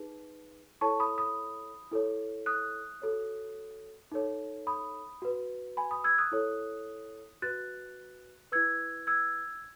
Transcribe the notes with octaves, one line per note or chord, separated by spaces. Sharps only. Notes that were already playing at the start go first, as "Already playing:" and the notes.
Already playing: D#4 G#4 B4
E4 A4 C#5 A5 C#6
B5 D#6
B5 D#6
E4 A4 C#5
D#6 F#6
F#4 A4 C#5
D#4 A4 C#5
B5 D#6
F#4 B4
G#5 B5
B5 D#6
E6 G#6
D#6 F#6
E4 A4 C#5
F#4 B4 F#6 A6
E4 B4 E6 G#6
E6 G#6